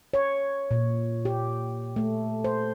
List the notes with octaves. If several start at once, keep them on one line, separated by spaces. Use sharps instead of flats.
C#5
A#2
G4
A3
C5